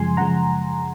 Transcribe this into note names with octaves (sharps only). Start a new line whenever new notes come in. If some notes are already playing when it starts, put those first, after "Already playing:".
Already playing: F#2 C#3 F3 G#3 G#5 C6
F#2 C#3 F3 G#3 F#5 A#5